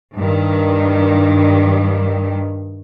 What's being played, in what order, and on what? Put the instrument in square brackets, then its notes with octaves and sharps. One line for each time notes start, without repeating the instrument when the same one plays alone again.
[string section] G2 D#3